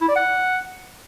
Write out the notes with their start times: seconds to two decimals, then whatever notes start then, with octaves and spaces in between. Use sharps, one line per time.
0.01 E4
0.08 D5
0.16 F#5